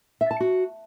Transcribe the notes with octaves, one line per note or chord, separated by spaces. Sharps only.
E5
A5
F#4